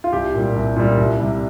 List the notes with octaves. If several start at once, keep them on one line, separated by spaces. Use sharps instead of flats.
F4
C2 G4
A#2 G3
C2
A#2 G3
C2
C3 G3